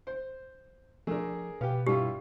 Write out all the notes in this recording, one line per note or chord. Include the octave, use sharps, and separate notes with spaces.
C5
F3 A3 D4 G#4 A#4
B2 B3 G4 F5
G2 E4 F4 G4